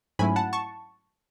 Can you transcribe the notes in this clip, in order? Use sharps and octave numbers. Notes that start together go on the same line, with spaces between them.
G#2 F#3 A3 C#4 E4 G#5 B5
F#5 A5
A5 C#6